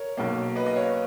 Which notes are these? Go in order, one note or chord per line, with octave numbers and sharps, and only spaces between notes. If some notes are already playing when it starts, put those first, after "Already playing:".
Already playing: A#4 C#5
B1 B2 A#3
B4 D#5
D#5
C#5 F5